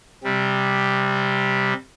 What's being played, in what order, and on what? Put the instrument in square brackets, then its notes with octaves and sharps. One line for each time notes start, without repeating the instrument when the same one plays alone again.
[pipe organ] C3 G3